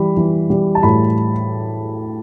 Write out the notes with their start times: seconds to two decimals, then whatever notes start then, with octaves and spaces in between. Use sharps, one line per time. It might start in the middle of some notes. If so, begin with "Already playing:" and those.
Already playing: E3 G3 B5
0.17 E3
0.50 G3
0.75 A5
0.83 A2 B5